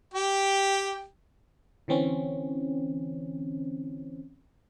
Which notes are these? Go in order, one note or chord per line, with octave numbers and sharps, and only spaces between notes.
G4 G5
D3 E3 C4 C#4